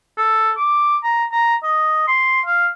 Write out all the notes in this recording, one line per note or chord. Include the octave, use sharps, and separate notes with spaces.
A4
D6
A#5
A#5
D#5
C6
F5